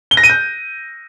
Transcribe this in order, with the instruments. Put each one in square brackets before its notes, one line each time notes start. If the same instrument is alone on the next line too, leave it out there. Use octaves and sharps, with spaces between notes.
[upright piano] G7
A#6
D#7
G6